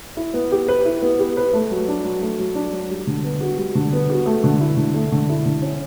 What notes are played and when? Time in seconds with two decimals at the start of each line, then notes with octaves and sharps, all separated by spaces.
0.17 E4
0.33 B3
0.52 G4
0.68 B4
0.85 E4
1.02 B3
1.19 G4
1.37 B4
1.53 A3
1.71 F#3
1.88 D4
2.04 F#3
2.21 A3
2.39 F#3
2.55 D4
2.73 F#3
2.91 G3
3.07 D3
3.24 B3
3.41 F#4
3.58 G3
3.75 D3
3.93 B3
4.10 F#4
4.26 A3
4.44 D3
4.60 E4
4.77 D3
4.94 A3
5.12 D3
5.29 E4
5.46 D3
5.62 C#4